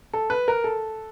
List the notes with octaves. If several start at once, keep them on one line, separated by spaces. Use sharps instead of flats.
A4
B4
A#4
A4